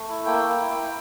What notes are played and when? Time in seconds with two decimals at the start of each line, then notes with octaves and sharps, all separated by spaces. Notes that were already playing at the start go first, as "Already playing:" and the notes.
Already playing: A3
0.09 E4
0.26 A#3 G5
0.43 A#3
0.61 E4
0.77 E4